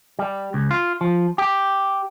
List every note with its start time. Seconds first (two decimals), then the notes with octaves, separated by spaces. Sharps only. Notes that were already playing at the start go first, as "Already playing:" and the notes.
0.19 G3
0.54 C#2
0.71 F4
1.01 F3
1.38 G4